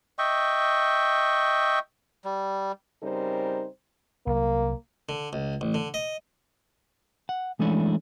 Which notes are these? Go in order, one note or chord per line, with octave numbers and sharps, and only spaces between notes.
D#5 E5 G5 C#6
G3
C#3 G3 C4 D#4 A#4 C5
C2 F#3 A#3
D3
C#2
A1
D3
D#5
F#5
E3 G#3 A3 C#4 D4 E4